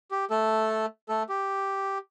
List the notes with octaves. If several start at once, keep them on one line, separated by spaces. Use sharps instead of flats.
G4
A3 A4
A3 A4
G4